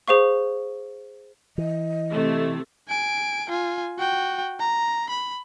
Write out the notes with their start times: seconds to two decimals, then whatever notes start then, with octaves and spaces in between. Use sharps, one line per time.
0.08 G#4 C5 F5 C#6
1.58 E3 D#5
2.12 C3 A3
2.88 G#5 D7
3.50 F4 G#5
3.98 F#4 G5
4.59 A#5
5.10 B5